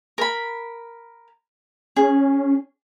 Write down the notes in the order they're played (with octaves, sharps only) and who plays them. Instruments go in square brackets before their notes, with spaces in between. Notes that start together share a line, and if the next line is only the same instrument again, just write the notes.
[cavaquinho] A#4 B5
[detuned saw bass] C#4 [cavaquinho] G#4